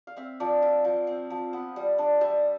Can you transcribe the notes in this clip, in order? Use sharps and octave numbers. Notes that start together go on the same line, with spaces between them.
F5
C4 E5
F3 D5
F4 E5
F3
C4
F3
B3
G3
D4
G3 E5